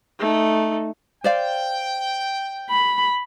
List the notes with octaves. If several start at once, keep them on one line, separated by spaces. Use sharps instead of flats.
A3 D#4
C5 D5 F5 G5
B5